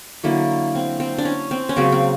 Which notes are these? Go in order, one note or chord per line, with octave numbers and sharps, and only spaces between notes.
D3 F#3 A#3 E4
C4
C4
D4
C#4
C4
C#4
C#3 F#3 A#3 C4
C4